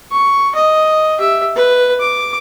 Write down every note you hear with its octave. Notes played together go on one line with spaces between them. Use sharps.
C#6
D#5
G4 E5
B4
D6